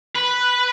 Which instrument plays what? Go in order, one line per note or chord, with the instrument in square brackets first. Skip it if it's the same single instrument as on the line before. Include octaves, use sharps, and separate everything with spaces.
[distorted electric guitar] B4